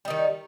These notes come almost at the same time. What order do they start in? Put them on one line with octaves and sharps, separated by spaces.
G3 D#4 D#3